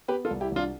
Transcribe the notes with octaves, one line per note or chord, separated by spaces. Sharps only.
B3 G4 B4
F4 A4
C2
E4 G4
C2 D4 F4